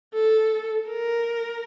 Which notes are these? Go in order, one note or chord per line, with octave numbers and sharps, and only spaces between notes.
A4
A#4